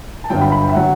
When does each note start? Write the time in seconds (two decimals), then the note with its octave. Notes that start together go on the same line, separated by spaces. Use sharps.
0.24 A5
0.30 G1 G2 D3 F#3 G5
0.41 B5
0.52 B5
0.63 G5
0.69 E5
0.75 D3 F#3 F#5